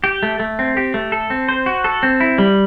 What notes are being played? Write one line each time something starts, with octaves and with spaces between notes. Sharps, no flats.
G4
A3
A3
C4
G4
A3
A4
C4
C5
F#4
A4
C4
E4
G3